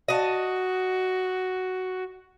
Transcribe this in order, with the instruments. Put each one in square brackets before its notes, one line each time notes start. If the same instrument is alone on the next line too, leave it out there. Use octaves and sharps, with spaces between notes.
[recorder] F#4 [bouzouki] D#5 A5